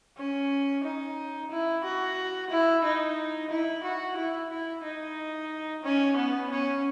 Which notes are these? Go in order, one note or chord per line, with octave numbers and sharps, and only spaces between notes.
C#4
D#4
E4
F#4
E4
D#4
E4
F#4
E4
E4
D#4
C#4
B3
C#4